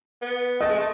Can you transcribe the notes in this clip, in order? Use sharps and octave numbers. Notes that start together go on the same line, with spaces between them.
B3
A3 D#5
G#3
A3